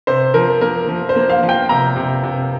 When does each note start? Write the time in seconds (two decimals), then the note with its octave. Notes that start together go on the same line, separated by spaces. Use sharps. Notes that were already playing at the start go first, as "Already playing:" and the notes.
0.07 C3 C5
0.34 F3 A#4
0.61 A#3 A#4
0.88 F3
1.09 C5
1.16 A#3
1.30 F5
1.43 F3
1.49 G5
1.69 C3 A#5
1.96 C3
2.23 C3